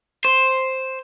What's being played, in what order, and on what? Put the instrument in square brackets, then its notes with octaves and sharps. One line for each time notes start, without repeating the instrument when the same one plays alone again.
[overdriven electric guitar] C5